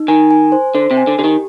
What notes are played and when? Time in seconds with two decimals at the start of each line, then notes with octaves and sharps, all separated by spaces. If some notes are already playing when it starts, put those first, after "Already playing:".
Already playing: D#4
0.08 D#3 G#5
0.31 G#5
0.52 C5
0.75 D3 C5
0.91 C3
0.97 G#5
1.07 D3
1.18 D3 G4
1.24 D#3